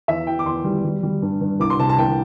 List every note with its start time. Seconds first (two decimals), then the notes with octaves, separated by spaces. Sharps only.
0.08 E2 E5
0.27 E3 G5
0.39 D6
0.45 E2 C6
0.64 G3
0.85 G3
1.03 G3
1.22 G2
1.41 G2
1.60 C2 D6
1.70 C6
1.79 C3 A5
1.89 A5
1.98 C2 G5